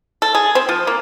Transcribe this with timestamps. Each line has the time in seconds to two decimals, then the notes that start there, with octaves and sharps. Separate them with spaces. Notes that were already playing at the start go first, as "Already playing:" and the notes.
0.22 A4
0.35 G#4
0.55 C4
0.69 F3
0.87 A#3